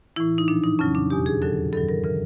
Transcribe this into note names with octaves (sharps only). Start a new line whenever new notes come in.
A2 E3 E4
D#4
A#2 F3 D4
D#4
F2 C#3 F#3 C#4
D4
E2 B2 F#3 G4
G#4
F2 D3 F#3 A4
G2 D#3 F#3 A4
A#4
C#3 E3 A#4